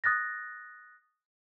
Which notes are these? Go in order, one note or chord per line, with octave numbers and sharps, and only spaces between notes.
D#6 F#6 A6 A#6